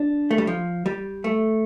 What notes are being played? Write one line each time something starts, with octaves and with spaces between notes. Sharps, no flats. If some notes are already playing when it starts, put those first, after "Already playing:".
Already playing: D4
A3
G3
F3
G3
A3